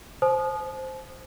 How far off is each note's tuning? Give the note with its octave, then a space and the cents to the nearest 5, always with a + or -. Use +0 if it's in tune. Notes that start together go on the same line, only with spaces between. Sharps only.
C5 +0 A5 -45 D#6 -20